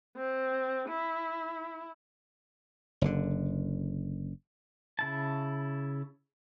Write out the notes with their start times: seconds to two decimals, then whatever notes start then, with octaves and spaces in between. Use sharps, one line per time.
0.16 C4
0.88 E4
3.01 F#1 D3
4.99 C#3 E4 A5